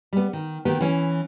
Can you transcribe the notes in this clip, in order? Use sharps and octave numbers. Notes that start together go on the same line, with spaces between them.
G3 B3
D#3
D#3 B3 G4
E3 C#4